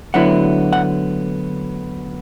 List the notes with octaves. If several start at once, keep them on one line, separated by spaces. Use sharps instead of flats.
D2 D3 F#3 B3 E4 F#5
F#5